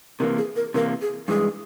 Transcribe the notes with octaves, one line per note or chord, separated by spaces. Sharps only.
C3 E3 A#3 A#4
G#4
A#4
C3 E3 A#3 A#4
G#4
G2 E3 G#3 G#4